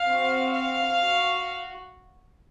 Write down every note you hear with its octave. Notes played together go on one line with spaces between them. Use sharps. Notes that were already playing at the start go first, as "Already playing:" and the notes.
Already playing: F5
C4 F#4
F5
F#4